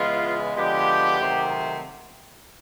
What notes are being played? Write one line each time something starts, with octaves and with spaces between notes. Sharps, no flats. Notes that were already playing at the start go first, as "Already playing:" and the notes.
Already playing: C#3 E3 G#3 B3 F4
D3 F3 G#3 B3 G4
C3 D#3 F#3 A3 C4